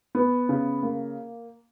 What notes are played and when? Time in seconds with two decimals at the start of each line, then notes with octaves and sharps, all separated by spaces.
0.15 B3
0.49 C#3
0.83 A#3